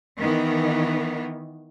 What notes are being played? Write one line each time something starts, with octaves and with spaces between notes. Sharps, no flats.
D#3 E3 B3